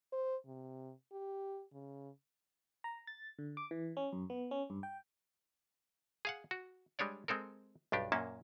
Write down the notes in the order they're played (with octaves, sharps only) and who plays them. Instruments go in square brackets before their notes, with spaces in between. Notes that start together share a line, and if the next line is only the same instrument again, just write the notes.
[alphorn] C5
C3
G4
C#3
[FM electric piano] A#5
A6
D3
D6
E3
C#4
F#2
B3
C#4
G2
G5
[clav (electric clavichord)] G#4 F5 F#5
F#4
G3 G#3 D4 C#5 D5
G#3 C4 A4 A#4
B1 G2 D4 G4
F#2 A#2 A#3 C#4 A5